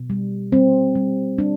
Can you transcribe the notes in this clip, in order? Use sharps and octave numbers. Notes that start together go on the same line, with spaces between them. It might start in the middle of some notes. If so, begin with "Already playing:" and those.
Already playing: B2
G3
G3 C4
G3
G3 D4